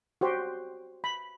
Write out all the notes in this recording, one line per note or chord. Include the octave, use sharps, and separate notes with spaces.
F#4 G4 C5
B5